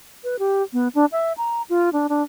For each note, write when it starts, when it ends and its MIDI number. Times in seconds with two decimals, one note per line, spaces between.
0.24 0.39 71
0.39 0.63 67
0.73 0.88 59
0.95 1.05 62
1.12 1.33 76
1.38 1.62 82
1.70 1.89 65
1.93 2.07 62
2.09 2.23 62